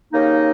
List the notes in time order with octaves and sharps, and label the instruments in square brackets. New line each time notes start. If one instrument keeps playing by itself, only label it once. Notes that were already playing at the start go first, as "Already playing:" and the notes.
[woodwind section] D#2 C#3 A#3 D#4